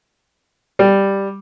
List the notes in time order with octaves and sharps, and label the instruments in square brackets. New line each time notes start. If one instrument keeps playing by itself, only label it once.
[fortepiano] G3